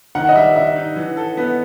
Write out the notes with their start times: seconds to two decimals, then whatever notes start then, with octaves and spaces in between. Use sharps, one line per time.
0.15 D#3 F#5
0.29 D#5
0.35 G3 E5
0.56 D#3 E5
0.76 D#4
0.96 E3
1.17 A4
1.37 B3